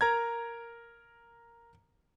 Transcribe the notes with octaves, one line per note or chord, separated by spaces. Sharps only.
A#4 A#5 G#6